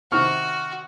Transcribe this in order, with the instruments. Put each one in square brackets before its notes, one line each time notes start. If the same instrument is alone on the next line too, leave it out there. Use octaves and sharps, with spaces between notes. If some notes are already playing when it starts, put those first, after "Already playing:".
[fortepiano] C3 D#3 C4 [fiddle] F#4 [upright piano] C#6 F6